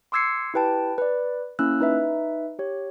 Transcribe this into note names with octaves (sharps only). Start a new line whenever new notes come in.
C6 D6 E6 G#6 C7 C#7
E4 G4 B4 G5 A5
B4 D5
A#3 C#4 E4 E6 F#6
D#4 B4 E5
G4 C#5